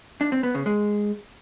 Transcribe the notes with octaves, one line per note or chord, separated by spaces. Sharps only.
D4
C4
B3
C#3
G#3